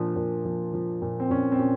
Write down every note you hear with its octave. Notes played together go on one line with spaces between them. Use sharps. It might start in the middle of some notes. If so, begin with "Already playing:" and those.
Already playing: A#2 F3 D4
A#2
F3
F3
A#2
C4
A#2 C#4
C4
A#2 C#4